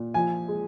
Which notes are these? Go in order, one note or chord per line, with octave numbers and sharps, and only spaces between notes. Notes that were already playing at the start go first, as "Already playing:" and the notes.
Already playing: A#2
F3 G#5
G#3